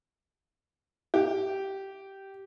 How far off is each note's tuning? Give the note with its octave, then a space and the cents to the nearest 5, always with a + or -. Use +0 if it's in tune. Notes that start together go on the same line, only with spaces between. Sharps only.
G4 -15